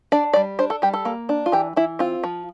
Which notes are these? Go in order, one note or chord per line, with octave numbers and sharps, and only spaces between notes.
D4 D5
D5
G3
D4 C5
A4
G3 G4
A4
A#3
D4
F4
E3 G4
E3 E4
C4 F4
F3